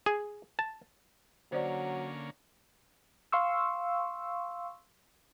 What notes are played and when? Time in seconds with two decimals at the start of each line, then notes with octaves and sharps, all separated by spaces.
0.06 G#4
0.59 A5
1.52 D3 F#3 A#3 C#4 C5 D5
3.32 F5 C6 C#6 E6